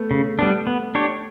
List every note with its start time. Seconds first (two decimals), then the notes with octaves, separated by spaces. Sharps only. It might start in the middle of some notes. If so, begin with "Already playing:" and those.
Already playing: A3 B3
0.11 C#3
0.39 G3 B3 D4
0.67 B3
0.95 D4 G4 C#5